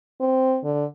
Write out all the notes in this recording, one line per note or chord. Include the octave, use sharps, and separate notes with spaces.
C4
D3